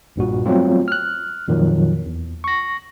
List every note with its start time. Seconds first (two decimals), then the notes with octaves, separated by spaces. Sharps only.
0.16 B1 G2 A#2 F#4
0.46 F#3 G3 A3 B3 C4 F4
0.88 F6 F#6
1.48 F2 A#2 D#3 F3 F#3
2.06 E2
2.44 C#6 A#6